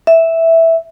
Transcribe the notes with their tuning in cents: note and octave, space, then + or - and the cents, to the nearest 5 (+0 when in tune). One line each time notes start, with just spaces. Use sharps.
E5 -5